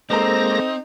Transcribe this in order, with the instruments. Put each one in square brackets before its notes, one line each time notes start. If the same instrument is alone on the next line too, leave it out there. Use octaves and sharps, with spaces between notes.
[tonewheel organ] G#3 A#3 A#6 [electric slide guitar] C4 [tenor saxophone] D#4 [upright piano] A4 C5 A#5